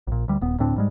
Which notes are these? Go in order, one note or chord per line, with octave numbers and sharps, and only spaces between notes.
A#1 A#2
D2 G3
D#1 B3
D2 A2 C4 D4
G#2 G3 G#3